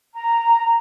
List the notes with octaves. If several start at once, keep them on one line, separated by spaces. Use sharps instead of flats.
A#5